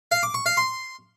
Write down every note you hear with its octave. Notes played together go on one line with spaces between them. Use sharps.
F5
D6
C#6
F5
C6